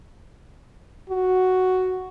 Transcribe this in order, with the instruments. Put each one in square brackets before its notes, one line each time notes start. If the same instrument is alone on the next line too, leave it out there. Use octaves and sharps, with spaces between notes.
[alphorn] F#4